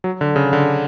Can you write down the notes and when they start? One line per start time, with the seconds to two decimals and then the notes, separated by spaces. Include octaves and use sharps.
0.04 F#3
0.21 D3
0.36 C#3
0.53 D3